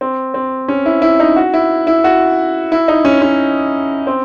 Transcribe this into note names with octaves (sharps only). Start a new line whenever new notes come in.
C4
C4
C#4
E4
E4
D#4
F#4
E4
E4
F#4
E4
D#4
C#4
C#4
C4